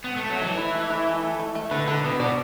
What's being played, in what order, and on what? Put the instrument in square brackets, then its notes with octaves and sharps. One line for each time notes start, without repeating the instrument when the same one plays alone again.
[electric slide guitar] B3
A3
F#3
[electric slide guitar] E3 [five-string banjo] A3
[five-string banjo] E4
A3
E4
A3
A4
A3
A3
[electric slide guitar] D3 [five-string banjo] B4
[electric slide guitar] D3 [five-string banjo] B4
[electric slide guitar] B2 [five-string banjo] B3
[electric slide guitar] B2 [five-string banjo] D5